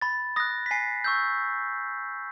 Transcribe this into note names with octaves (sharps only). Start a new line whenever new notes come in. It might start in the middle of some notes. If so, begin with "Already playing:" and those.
B5 A6
D#6 F#6 A#6
B6
G#5 C7
C#6 E6 G6